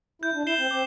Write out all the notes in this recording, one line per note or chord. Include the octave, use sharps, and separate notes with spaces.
E4 G6
D4
E4 C7 E7 G7
C4
C4 D6